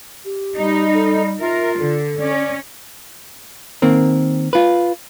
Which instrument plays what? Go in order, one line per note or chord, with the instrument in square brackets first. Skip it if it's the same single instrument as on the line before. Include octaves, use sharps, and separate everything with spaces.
[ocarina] G4
[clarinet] G3 [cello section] D#4
[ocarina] A4
[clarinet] F4 [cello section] A#4 [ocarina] E5
[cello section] D3 [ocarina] A4
[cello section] C#4 [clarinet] D5
[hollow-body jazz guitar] D#3 A#3 C4 A#4
F4 B4